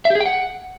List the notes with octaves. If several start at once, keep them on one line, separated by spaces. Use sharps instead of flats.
E5
G4
G#4
G5
F#5